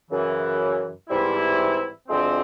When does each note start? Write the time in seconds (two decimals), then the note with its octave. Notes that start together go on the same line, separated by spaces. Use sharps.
0.11 F#2 C#3 E3
1.09 G#2 E3 G3 C4 E4
2.08 D2 D3 F3 G#3 C4